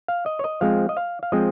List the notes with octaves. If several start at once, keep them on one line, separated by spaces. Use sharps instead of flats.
F5
D#5
C#5
D#5
F3 G#3 C4 F5
D#5
F5
F5
F3 G#3 C4 D#5